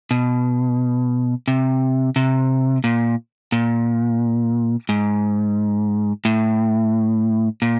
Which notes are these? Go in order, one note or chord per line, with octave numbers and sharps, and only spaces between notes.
B2
C3
C3
A#2
A#2
G#2
A2
A#2